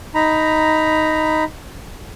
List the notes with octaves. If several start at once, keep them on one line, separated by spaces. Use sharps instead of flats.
D#4 A#5 B5